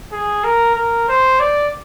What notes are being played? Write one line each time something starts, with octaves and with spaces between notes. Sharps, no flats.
G#4
A#4
A#4
C5
D5